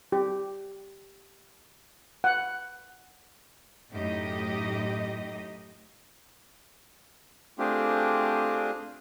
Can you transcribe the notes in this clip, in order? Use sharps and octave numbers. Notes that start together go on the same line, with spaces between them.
G4
F#5
F#2 A2 D#4 G4 D#5
A3 C4 D4 F4 G4 G#4